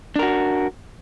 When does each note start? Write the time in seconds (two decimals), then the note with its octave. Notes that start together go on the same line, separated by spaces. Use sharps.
0.16 D4
0.19 A#4
0.23 F#4